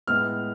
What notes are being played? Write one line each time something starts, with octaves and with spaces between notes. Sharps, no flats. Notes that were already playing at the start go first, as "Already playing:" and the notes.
A2 G#3 B3 F6